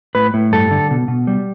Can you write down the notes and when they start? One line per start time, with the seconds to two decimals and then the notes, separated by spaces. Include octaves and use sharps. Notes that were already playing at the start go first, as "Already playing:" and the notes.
0.15 A2 B4
0.34 A2
0.52 G2 A4
0.71 D3
0.90 B2
1.08 B2
1.27 G3